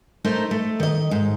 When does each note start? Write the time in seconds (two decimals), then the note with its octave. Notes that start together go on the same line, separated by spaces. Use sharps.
0.25 A3 D#4 A#4 C5
0.51 A3
0.80 D#3 D#5
1.11 G#2